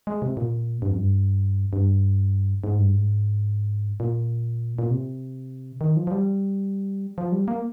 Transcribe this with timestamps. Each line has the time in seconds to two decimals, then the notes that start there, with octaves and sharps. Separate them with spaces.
0.07 G#3
0.22 C3
0.37 A#2
0.82 G2
0.91 F2
0.98 G2
1.73 G2
2.64 G#2
2.79 G2
2.94 G#2
4.00 A#2
4.79 A#2
4.90 C3
5.81 D#3
5.96 F3
6.07 F3
6.11 G3
7.18 F3
7.32 G3
7.48 A#3